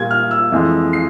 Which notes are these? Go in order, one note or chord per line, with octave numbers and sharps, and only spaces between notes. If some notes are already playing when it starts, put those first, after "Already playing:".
Already playing: A#2 G3 A#3 G#6
F6
E6
F2 E3 G#3
C7